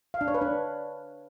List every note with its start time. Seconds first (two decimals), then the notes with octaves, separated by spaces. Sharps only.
0.14 F5
0.21 D4
0.28 C#5
0.35 B4
0.41 D4